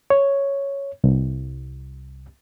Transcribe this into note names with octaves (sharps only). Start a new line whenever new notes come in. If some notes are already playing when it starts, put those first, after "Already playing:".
C#5
C2